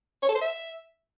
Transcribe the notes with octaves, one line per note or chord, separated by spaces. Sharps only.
C#5
A4
C5
E5